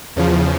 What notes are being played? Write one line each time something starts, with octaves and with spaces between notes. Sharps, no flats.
E2 C#3 F3